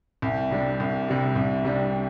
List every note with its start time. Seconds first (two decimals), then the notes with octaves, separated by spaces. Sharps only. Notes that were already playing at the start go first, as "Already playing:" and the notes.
0.22 C2
0.51 C3 G3 D4
0.80 C2
1.08 C3 G3 D4
1.36 C2
1.65 C3 G3 D4